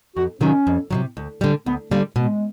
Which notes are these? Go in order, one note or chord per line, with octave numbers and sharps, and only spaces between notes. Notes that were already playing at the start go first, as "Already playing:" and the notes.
F2 F#4
C3 D#3 F#3 C#4
F2
C3 D#3 F#3
D2
D3 G3
D2 B3
D3 G3 A#3
B2 G#3